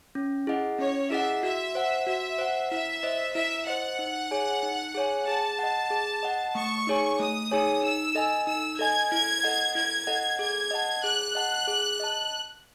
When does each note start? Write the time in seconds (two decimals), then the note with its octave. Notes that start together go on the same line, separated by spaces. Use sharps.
0.15 C#4
0.47 E4 G#4 D#5 F#5
0.79 C#4 C#5
1.10 E4 G#4 D#5 E5 F#5
1.43 F#4 E5
1.75 C5 F#5
2.07 F#4 E5
2.39 C5 F#5
2.70 E4 E5
3.03 C5 D#5
3.35 E4 E5
3.67 C5 D#5 F#5
3.99 D#4
4.31 G#4 C#5 G#5
4.63 D#4
4.94 G#4 C#5 G#5
5.27 G#4 A5
5.59 D#5 F#5
5.91 G#4
6.23 D#5 F#5
6.55 A3 C#6
6.87 D#4 G#4 C#5 G#5
7.19 A3 D#6
7.52 D#4 G#4 C#5 G#5
7.83 D#4 E6
8.15 A4 D#5 G#5
8.47 D#4 E6
8.79 A4 D#5 G#5 G#6
9.11 E4 G#6
9.43 A4 D#5 F#5
9.75 E4 G#6
10.07 A4 D#5 F#5
10.39 G#4 G#6
10.71 D#5 F#5 A5
11.04 G#4 F#6
11.35 D#5 F#5 A5
11.67 G#4
12.00 D#5 A5